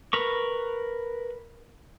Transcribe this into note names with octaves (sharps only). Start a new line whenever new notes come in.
A#4 B4 C#6